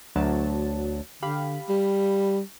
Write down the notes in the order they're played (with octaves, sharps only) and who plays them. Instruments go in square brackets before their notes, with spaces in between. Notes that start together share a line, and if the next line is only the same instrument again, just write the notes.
[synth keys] D2 F#3 A5
[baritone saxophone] D3 [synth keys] G4 F5 B5
[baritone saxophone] G3